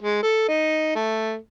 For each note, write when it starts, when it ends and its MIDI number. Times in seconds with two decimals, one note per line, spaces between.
0.02 0.22 56
0.23 0.47 69
0.49 0.93 63
0.96 1.37 57